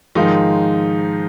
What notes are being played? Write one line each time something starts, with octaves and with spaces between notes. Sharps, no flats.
G#2 D#3 F3 G#3 D#4